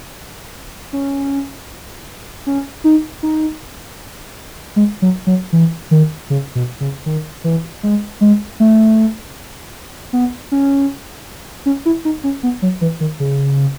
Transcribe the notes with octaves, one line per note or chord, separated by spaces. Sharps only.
C#4
C#4
D#4
D#4
G#3
F#3
F#3
E3
D#3
C#3
B2
C#3
D#3
E3
G#3
G#3
A3
B3
C#4
C#4
E4
D#4
C#4
B3
F#3
E3
D#3
C#3